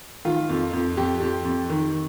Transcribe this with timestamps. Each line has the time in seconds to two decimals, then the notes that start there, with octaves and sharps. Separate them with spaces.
0.25 D#3 F4
0.49 F2
0.73 F2
0.97 F2 G4
1.20 F2
1.45 F2
1.69 D#3